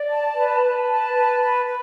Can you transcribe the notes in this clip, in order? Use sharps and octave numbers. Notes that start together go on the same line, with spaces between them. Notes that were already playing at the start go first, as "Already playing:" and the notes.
Already playing: D5
A5
B4
B4
A5
B4
B4
B4